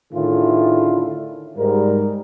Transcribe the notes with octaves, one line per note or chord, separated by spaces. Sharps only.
A2 D3 D#3 E4 F4 G#4
G#2 G3 A#4